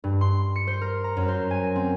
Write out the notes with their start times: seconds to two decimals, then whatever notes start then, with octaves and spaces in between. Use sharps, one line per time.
0.04 G2
0.21 C6
0.56 C#7
0.67 C5
0.81 A#4
1.04 A#5
1.17 F#2
1.28 C5
1.51 G#5
1.76 C4